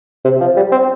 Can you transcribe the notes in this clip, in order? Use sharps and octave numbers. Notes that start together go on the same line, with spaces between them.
C3
F3
G3
C4